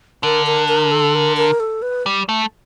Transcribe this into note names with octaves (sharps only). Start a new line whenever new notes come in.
D3 A#4
A#4
A#4
A4
A#4
A#4
A4
B4
G3
A3